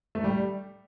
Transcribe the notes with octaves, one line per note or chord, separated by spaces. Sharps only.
A3
G3